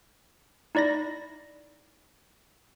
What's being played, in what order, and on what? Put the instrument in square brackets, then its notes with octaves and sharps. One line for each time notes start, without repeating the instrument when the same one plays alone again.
[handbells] D#4 E4 D5 B5 A#6